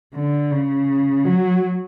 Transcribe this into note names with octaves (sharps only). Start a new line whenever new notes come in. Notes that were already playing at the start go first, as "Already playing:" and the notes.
D3
C#3
F#3